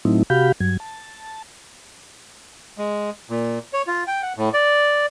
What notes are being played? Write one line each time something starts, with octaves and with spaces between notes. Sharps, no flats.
A2 F#3 A3 C4 D#4 E4
C3 F#4 G4 F5 B5 G6
G2 F#3 G#6
A5
G#3
A#2
C#5
F4
G5
F#5
A2
D5